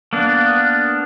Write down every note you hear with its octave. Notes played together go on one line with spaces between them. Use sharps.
A#3 B3 D4